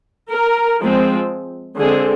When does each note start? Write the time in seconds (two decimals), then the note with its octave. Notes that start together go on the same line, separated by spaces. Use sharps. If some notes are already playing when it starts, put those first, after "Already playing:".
0.31 A#4
0.81 F3 G#3 C4
1.79 D3 G#3 C4 G#4